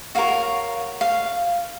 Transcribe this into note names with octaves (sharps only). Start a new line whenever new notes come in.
F#4 A#4 C#5 F5
F5